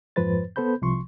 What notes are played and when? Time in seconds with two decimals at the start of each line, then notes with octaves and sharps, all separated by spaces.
0.16 F2 G#2 F3 B4 C5 A6
0.56 B3 A4 C5 B5 G6
0.82 C2 C3 F3 C6 C#6